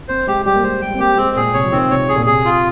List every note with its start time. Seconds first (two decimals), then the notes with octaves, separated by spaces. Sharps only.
0.08 C4 C5
0.27 G#3 G4
0.46 G3 G4
0.55 A#3
0.63 G#3 C5
0.82 G3 G5
0.94 C4
0.99 A#3 G4
1.17 G#3 C4
1.36 A#2 G#4
1.54 C3 C#5
1.65 F3
1.72 D#3 C4
1.90 C3 C#5
2.09 G#4
2.16 A#2
2.26 C3 G#4
2.45 F4